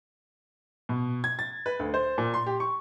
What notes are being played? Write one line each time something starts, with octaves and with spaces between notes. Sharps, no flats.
B2
G#6
A6
B4
D2
C5
A#2
C6
G4
C#6